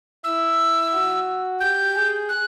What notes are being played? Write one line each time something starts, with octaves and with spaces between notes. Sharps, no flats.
E4 E6
F#4
G4 G6
G#4
F#6